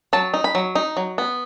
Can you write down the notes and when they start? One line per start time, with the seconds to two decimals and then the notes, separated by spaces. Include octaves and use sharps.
0.13 F#3 A5
0.34 D#4
0.44 B5
0.55 F#3
0.75 D#4
0.97 F#3
1.18 B3